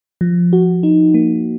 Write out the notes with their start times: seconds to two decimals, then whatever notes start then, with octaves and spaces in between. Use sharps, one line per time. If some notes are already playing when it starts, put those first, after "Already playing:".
0.21 F3
0.53 F#4
0.83 D#4
1.14 A#3